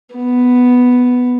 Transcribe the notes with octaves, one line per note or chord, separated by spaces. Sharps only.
B3